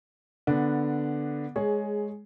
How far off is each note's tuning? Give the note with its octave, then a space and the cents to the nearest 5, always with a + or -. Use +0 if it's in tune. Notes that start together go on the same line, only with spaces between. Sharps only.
D3 +0 B3 +0 D4 +0
G#3 +0 G#4 +15 C#5 +0